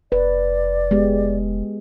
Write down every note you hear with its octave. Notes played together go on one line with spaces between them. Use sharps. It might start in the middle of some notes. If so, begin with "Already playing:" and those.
F1 B4 D5
G#3 B3 G4